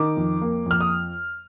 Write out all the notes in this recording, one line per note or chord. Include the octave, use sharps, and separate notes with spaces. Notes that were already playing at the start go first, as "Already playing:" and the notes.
Already playing: D#3 D6
F2
A#3
F2 F6
D#6